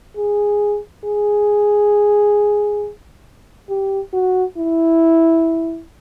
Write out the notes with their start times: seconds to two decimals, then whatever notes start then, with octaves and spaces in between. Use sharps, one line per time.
0.17 G#4
1.05 G#4
3.69 G4
4.13 F#4
4.57 E4